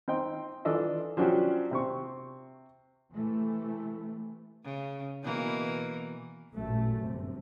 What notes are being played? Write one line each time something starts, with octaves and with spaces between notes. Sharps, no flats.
C4 D#4 G5
E3 D4 F4 A4 D#5
F3 F#3 C#4 D4 F#4 G4
C3 C4 C#6
C3 E3 A3
C#3
B2 E3 A#3
A1 F#2 A#2 A3
G1 C3